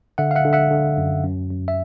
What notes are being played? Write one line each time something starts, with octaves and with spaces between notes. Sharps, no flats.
D3 E5 F#5
F5
E5 F#5
D3
E5 F#5
D3
F#2
F#2
F#2
E5